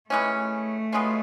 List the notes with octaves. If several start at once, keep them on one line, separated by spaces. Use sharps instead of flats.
E3 G#3 A3 C#4
B2 G#3 C#4 F4